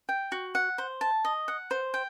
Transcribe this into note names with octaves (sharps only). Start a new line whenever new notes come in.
G5
F#4
F#5
C5
A5
D#5
F#5
C5
G5